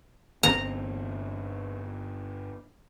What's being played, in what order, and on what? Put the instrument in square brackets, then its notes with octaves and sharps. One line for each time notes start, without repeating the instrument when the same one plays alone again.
[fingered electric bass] G1 D3 C4 [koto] A#5